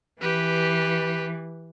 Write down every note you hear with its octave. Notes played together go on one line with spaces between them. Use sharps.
E3 G4 B4